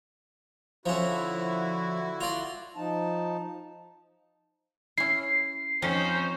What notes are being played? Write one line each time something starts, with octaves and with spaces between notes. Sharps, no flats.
D3 F3 C#4 E4 F#4
F4 D5
F3 D#4 A5
C#4 E4 C7
F2 C#4 D#4 C5 A#5 C6